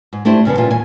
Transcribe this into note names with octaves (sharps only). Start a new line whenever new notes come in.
G#2
A3 D4 E4 G4 C5
G2 C#3 F3 B3
A#2 E3 G3 F4
D#2 G#5